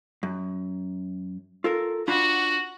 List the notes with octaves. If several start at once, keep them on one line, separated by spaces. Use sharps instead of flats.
F#2
F4 A4 A#4
D4 F4 F#4 F#5 B5